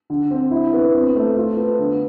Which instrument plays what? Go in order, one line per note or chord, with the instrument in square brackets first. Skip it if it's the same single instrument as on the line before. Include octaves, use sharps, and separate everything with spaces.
[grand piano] D3
C4
E4
B3
C4
A3
F4
B3
D3